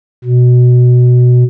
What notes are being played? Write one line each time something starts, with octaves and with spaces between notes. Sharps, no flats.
B2